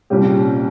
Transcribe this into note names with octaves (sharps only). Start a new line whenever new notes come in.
C2 A#2 G3 C#4 G4